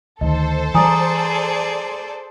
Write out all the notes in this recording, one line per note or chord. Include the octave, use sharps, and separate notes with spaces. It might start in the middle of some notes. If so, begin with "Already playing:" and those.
D2 D#3 A4 C5 D#5
E3 G3 G#4 D5 G#5 A#5 D#6